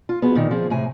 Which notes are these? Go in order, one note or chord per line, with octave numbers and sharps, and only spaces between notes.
F4
F3 B3 F#4 G#4
A#2 D#3
F3 C4 G#4
A2 C3 G#5